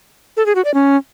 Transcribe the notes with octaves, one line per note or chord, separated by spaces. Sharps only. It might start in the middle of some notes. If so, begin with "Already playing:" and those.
A4
G#4
F#4
D5
C#4